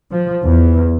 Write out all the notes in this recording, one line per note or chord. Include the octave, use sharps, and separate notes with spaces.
F3
E2